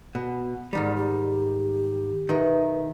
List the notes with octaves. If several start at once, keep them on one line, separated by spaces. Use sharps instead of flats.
B2
G#2 D#3 G3 D5
G4
B1 D#3 B4 E5